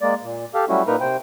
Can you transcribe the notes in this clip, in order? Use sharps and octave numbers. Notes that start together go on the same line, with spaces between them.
G#3 A#3 D5
A#2
G4 A4 F5
F#3 G3 A3 C#4 E4 F#4
A#2 A#3 D#4 A#4 B4 A#5
C3 C5 G5